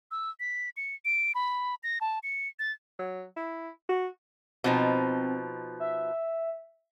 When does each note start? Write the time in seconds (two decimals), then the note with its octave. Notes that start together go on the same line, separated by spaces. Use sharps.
0.11 E6
0.40 B6
0.77 C#7
1.05 D7
1.35 B5
1.83 A#6
2.01 A5
2.23 C#7
2.59 A6
2.99 F#3
3.37 E4
3.89 F#4
4.64 B2 F3 C4 D#4
5.80 E5